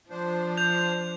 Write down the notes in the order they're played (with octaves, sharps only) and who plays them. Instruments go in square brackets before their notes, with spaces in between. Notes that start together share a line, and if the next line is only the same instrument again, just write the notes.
[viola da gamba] F3 [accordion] D4 C5
[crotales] G6 F7